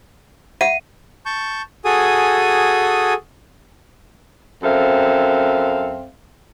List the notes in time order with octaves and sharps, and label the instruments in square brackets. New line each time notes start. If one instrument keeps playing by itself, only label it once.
[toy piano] E5 F#5 [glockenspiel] D#7
[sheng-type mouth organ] A5 C#6 G6
F#4 G#4 A4 G#5 D#6
[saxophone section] F#2 C4 A4 E5 F5